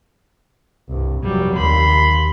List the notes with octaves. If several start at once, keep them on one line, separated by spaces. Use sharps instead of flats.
C2 G2
F1 F#3 G3
D#2 B5 C6